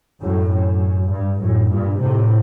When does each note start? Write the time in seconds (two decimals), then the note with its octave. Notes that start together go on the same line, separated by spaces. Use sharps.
0.21 F#2 A2
0.50 F#2
1.10 G2
1.40 F#2 A2
1.68 G2 A#2
1.99 A2 C3